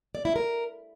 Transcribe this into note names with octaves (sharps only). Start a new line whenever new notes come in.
D5
E4
A#4